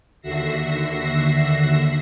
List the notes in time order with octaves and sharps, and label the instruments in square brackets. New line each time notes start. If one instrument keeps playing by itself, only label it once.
[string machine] D#2 D3 F#4 E5 A#6 C7